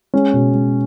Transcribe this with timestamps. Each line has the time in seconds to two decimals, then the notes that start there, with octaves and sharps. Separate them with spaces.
0.14 G#3 C#4
0.33 B2
0.54 G#3